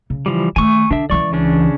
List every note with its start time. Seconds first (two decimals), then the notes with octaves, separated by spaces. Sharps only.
0.10 C#3
0.26 E3 F3 G3
0.56 D#3 A3 G#5 C#6 E6
0.91 D3 D4 E5
1.10 C#2 E3 D5 C#6
1.33 C#3 C#4 D4